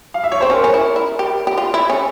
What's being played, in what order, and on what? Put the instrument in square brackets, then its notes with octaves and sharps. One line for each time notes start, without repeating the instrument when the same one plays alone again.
[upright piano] F5
E5
C#5
[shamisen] C4 [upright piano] C5
[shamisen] C#4 [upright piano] A#4
[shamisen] C#4
E4
E4
G4
G4
F4
E4
C#4